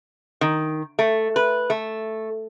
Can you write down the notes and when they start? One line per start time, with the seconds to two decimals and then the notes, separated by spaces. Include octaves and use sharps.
0.41 D#3
0.99 A3
1.36 B4
1.70 A3